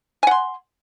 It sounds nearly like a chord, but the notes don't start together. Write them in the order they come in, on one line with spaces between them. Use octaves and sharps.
G#5 F#5 C6